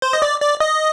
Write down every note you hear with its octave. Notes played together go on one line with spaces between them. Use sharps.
C5
D#5
D5
D5
D#5